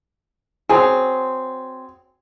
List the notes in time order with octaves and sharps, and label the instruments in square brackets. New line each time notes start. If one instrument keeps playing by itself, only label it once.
[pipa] F#3 C4 [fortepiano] G#4